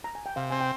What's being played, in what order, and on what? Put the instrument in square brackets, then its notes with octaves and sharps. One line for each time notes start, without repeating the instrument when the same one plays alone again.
[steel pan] A#5
G#5
G5
[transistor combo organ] C3 [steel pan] F5
[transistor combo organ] C4 [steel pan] G#5
[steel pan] G5